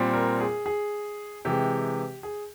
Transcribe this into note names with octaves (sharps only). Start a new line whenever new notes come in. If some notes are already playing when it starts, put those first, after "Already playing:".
Already playing: A#2 G3 C4
A#4
G#4
G#4
C3 E3 G#3 G4
G#4